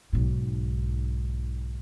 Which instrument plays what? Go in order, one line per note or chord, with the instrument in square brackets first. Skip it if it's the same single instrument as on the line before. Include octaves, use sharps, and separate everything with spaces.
[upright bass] B1 G#2